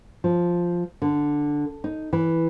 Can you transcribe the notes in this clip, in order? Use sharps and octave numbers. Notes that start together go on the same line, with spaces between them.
F3
D3
D#4
E3